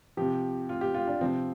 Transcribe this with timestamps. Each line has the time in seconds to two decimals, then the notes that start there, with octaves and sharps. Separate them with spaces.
0.17 C3 F3 G4
0.69 F4
0.81 G4
0.94 F4
1.07 D4
1.21 C3 F3 C4